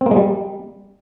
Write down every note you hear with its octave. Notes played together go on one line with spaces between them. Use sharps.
C4
A#3
G#3
G3